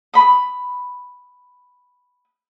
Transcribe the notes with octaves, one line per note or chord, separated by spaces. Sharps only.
B5 D#6